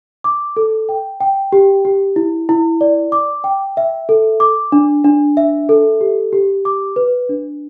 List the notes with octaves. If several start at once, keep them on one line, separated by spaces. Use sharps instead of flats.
D6
A4
G5
G5
G4
G4
E4
E4
D5
D6
G5
E5
A4
D6
D4
D4
E5
A4
G4
G4
D6
B4
D4